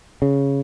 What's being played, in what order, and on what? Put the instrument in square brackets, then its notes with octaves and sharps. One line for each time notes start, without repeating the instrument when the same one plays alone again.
[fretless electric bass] C#3